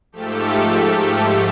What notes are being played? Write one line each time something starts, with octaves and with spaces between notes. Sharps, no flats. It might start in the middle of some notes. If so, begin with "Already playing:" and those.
G#2 F3 A3 G4 A4